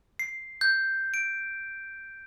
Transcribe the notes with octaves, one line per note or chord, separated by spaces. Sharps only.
C7
G6
D7